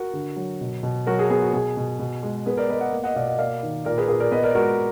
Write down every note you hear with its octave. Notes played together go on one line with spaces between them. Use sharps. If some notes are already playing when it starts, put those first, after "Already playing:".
Already playing: F#4 A#4
D3
F#3
B2
B2
F#3 F#4 A#4
G#4
B3 G#4
F#4
B2 G#4
B2
B2
G#3
B3 G#4 B4
A#4 D5
B3 B4 D#5
D#5 F#5
A#3
D#5 F#5
B2 D5 F5
D#5 F#5
A#3 D5 F5
D#3
A#2 A#4 D5
G#4 B4
A#2 G#4 B4
A#4 D5
B3 B4 D#5
A#4 D5
G#3 F#4 A#4